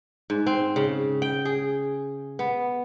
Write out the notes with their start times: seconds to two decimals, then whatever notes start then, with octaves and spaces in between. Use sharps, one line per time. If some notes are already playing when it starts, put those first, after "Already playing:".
0.30 G#2
0.47 C4
0.76 C#3
1.22 G5
1.45 G#4
2.39 B3